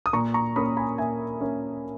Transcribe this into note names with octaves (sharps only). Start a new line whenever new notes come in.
D#6
A#2 A#5 C#6
A#5 C#6
A#3 C#4 B5 D#6
G#5 B5
A#2 E5 G#5
A#3 C#4